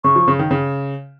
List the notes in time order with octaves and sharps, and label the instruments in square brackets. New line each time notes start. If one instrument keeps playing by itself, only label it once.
[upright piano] C#3 [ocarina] C#6
[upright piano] F3
C#3
D#3
C#3